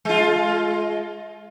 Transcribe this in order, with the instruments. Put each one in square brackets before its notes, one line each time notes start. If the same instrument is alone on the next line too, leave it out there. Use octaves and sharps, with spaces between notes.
[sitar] G#3 F4